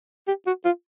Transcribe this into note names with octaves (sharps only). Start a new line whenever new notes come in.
G4
F#4
F4